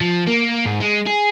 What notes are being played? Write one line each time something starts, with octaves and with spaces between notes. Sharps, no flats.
F3
A#3
G#2
G#3
G#4